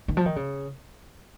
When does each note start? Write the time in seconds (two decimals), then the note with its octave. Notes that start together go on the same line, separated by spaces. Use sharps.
0.08 D#3
0.17 F3
0.25 D#3
0.36 C#3